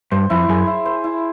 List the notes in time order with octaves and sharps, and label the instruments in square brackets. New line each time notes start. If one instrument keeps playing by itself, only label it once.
[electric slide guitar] G2 [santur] C5
[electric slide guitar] F2 [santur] E4
[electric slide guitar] F#2 [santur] G#4
[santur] E4
C5
E4